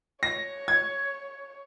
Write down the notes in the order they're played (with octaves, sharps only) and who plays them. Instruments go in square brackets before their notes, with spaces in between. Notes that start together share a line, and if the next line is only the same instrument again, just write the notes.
[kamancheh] C#5 [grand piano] A#6
[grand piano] G#6